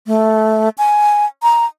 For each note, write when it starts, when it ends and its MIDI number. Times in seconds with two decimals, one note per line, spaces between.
0.07 0.69 57
0.78 1.25 80
1.43 1.66 82